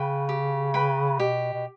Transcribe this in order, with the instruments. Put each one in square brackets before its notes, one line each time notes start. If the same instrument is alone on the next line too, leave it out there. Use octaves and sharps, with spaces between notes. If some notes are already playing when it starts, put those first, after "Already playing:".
Already playing: [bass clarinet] C#3 [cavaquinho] B4 G5 B5
[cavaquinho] G4
B4 G5 B5
[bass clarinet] B2 [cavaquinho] G4
[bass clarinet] B2